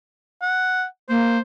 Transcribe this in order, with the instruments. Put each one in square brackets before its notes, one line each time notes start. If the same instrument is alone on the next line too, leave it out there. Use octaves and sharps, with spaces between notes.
[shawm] F#5
[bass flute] A#3 [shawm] C5